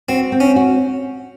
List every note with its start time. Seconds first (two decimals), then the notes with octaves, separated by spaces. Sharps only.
0.09 C4 F#4
0.32 C4
0.40 C#4
0.56 F#4